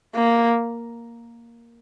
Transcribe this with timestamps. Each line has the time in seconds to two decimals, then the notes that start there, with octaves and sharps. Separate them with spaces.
0.15 A#3